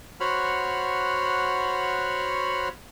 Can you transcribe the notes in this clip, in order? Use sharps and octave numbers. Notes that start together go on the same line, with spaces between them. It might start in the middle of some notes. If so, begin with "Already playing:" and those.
F#4 C5 C#5 F#5 B5 F6